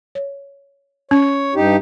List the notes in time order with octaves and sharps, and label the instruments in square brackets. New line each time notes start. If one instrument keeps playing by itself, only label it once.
[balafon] C#5
[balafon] C#4 [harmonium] C#5
[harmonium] G2 D#4 G4